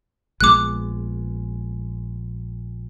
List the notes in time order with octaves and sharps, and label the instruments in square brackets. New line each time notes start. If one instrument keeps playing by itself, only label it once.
[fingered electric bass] A#1 G#3 B3 [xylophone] D6 F#6